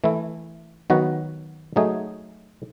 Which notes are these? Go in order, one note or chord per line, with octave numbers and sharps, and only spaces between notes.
E3 A3 E4
D#3 F#3 B3 F#4 B4
F#3 A3 D#4 G#4